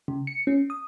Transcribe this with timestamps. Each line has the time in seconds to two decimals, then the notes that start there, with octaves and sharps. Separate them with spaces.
0.08 C#3
0.27 C#7
0.47 C#4
0.70 D#6